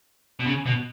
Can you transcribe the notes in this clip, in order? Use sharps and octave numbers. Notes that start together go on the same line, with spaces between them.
B2
C#3
B2